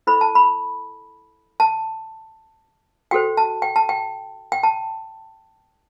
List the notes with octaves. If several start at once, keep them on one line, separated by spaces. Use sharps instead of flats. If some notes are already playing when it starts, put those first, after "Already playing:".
E4 A4 C5 B5
A5
B5
A5
F#4 A4 C5 G5
A5
G5
A5
G5
G5
A5